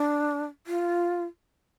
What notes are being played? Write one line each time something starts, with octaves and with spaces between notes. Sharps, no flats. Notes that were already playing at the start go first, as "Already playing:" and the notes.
Already playing: D4
F4